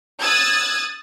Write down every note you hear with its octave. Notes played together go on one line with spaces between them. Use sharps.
D#6 E6 F#6 G#6 A6